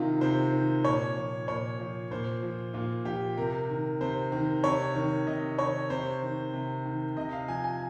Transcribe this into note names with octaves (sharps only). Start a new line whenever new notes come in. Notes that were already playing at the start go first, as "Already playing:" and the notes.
Already playing: C3 D#3 D#4 F4
C3 C5
D#3
A#2 C#5
F3
A#2 C#5
F3
A#2 C5
F3
A#2 F4
F3 G4
C3 A#4
D#3
C3 C5
D#3
C3 C#5
D#3
C3 D#5
D#3 C#5
C3 C5
D#3
C3
D#3
C3 D#5
F5
F3 G#5
G#5